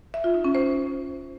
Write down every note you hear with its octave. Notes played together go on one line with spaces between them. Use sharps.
E5
F4
D#4
C#4
C5